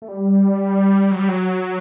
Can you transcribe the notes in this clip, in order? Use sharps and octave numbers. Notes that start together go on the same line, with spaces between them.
A3
G3
F#3
G3
F#3